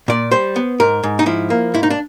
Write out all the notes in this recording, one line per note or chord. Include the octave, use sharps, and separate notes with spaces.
A#2 D5
G3 C5
B3
G#2 A#4
G#2
D#4
F3 E4
A#3
G#2 E4
D#4
D4